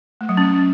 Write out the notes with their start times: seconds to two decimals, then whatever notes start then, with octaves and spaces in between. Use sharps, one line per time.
0.21 A3
0.29 F#3
0.37 C#4